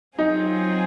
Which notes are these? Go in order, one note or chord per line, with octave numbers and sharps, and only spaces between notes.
F#3 C4 D#4 F4 G#4